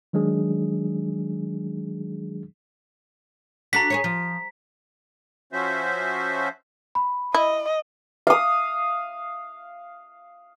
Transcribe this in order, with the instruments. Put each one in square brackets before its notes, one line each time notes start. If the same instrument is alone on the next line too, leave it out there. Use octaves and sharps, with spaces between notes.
[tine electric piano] D#3 F#3 G#3 D4 G#4
[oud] D4 F#4 A4 [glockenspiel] A#5 B6
[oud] G#4 B4 C#5
F3
[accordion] F3 C#4 F#4 C5 E5
[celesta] B5
[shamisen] E4 [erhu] D#5
[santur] F5 D#6